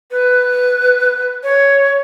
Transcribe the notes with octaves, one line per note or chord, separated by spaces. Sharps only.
B4
C#5